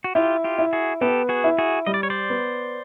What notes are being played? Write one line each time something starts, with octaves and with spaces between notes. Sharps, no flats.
F#4
E4 F4 G4
F4 G4
E4
F#4 G#4
B3 G4 A4
F#4 G#4
E4
F#4 G#4
G3 D#5
D5
C#5
C5 D5
B3